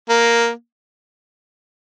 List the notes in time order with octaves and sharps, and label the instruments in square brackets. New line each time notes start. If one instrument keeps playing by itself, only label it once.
[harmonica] A#3